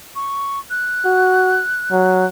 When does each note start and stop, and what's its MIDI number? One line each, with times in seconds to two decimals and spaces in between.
0.16 0.60 85
0.70 2.27 90
1.05 1.62 66
1.91 2.27 54